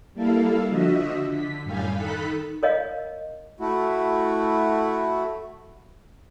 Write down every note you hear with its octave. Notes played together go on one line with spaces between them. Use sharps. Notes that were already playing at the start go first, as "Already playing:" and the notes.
G3 A#3 E4 A4 F5
D3 F3 F#4 D#5 E5
D3 B6
F#2 A2 G3 F5 G5 G#5
D#3 D#4 A4 B5 F#6 B6
A#4 C#5 D#5 F5
A3 E4 F#4